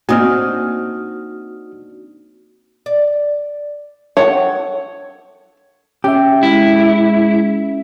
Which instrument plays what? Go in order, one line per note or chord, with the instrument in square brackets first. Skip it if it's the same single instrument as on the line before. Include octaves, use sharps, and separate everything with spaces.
[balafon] A#3 [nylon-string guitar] C4 D4 D#4 [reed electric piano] F#4 D#6 F6
[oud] D5
[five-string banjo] A4 C#5 F#5
[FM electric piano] C#4 E5 [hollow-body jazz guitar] G4
[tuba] G#3 [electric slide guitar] E4